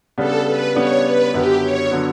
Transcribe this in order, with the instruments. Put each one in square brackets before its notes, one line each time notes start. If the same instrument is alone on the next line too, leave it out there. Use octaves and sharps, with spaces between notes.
[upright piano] C#3 G3 B3 D4 [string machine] A4
[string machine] B4
[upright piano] C#3 G3 B3 D4 [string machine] C#5
[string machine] B4
[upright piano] F#2 D3 F#3 B3 [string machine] G4
[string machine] C#5
[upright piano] D3 F#3 B3